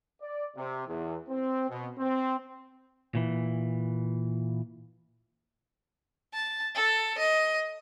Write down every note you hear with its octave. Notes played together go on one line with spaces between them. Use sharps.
D5
C3
E2
C4
B2
C4
A#2 E3
A5
A4
D#5